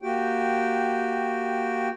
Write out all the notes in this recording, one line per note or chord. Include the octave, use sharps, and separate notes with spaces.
A#3 F#4 G4 G5